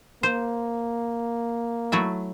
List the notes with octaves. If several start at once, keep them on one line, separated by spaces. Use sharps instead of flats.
A#3 C5
F#3 A3 E4